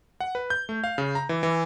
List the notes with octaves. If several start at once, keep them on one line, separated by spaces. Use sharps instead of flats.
F#5
B4
G6
A3
F5
C#3
A#5
E3
E3